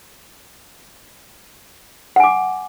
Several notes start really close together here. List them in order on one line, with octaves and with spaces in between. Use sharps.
F#5 G#5 D6